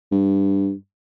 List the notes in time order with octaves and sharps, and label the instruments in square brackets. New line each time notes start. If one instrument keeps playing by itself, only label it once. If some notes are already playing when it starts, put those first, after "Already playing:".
[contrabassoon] G2